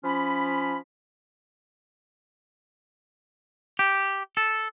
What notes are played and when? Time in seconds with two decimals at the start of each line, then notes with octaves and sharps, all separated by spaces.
0.04 F3 C#4 B5
3.79 G4
4.37 A4